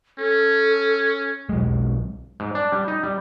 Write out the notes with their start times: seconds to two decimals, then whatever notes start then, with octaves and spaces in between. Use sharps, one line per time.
0.18 C#4 A4
1.49 B1 F#3 G#3
2.40 G#2
2.55 D4
2.72 G3
2.88 D#4
3.03 G3